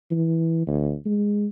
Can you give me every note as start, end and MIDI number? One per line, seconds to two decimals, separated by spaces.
0.11 0.65 52
0.67 0.95 38
1.06 1.47 56